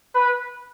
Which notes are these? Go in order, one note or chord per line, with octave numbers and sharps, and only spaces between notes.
B4